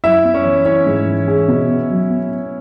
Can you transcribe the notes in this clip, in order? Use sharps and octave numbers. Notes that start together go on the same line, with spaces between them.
F#2 E4 E5
B3
C#4 C#5
E3
C#4 E4 C#5
G#2
E3
G#4
B2
B3
F#3
B3
B3